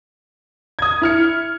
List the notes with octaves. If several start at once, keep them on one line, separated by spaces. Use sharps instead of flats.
D#6 G#6
E4 F6 C#7